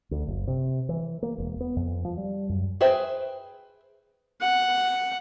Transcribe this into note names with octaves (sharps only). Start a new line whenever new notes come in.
D2
F#1
C3
E3
A#3
E1
B3
F2
F3
G3
F#2
G#4 B4 C5 E5 G5
F#5